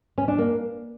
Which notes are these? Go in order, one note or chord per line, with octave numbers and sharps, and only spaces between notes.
C#4
D4
A#3